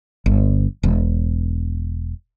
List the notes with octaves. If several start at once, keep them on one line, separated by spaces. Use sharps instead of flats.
G1
E1